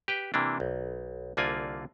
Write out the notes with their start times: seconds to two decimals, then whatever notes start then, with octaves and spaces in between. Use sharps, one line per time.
0.08 G4 B4 G5
0.34 C3 E3 A#3 D4
0.60 B1
1.37 C2 D3 A#3 F4 D5 G#5